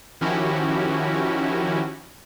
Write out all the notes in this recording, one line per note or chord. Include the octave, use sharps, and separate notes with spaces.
D#3 F3 C#4 E4 F#4 G4